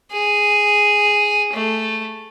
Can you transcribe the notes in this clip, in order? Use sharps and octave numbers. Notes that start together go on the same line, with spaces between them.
G#4
A3